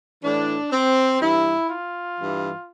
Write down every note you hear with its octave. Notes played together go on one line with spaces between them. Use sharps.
A2 E3 D4
C4
G2 E3 E4
F4
G2 E3